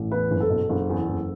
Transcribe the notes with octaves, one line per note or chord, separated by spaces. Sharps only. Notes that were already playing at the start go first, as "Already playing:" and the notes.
Already playing: A1
E2 B4
F#1
A4
B2
F#1
E2
F#1